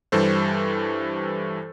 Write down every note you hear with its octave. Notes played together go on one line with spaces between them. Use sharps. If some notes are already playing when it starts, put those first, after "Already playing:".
G2 E3 G3 A4 C5